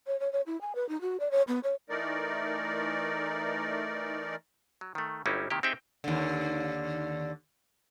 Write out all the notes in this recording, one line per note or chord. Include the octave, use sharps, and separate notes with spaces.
C#5
C#5
C#5
E4
G#5
B4
D#4
F#4
D5
C#5
B3
C#5
E3 A3 D#4 A#4 D5
F#3
D#3 A3
G1 F#3 G3 C#4 D#4 E4
C3 D#3 A#3 E4 G4
C4 D#4 G4 G#4 E5 G5
D#2 D3